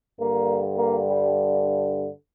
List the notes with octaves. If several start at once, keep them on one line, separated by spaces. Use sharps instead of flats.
G2 D3 A#3
A#3
G3